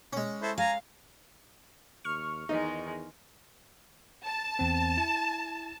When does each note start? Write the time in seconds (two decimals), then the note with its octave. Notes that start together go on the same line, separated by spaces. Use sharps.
0.13 G#3 C#4
0.42 E4 A4 C5
0.58 F5 G#5 A#5
2.05 D#2 C#6 F6
2.49 E2 D#3 G#3 D#4
4.25 A5
4.59 E2 C4
4.97 E4